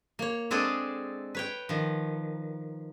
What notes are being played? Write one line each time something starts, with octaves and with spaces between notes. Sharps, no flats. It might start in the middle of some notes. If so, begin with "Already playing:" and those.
A#3 C#5
G#3 C4 D4 G#4 A4 D5
B4 C#5 G5
D#3 F3